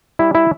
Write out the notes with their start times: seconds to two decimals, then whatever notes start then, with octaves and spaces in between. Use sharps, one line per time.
0.19 G3 E4
0.35 E4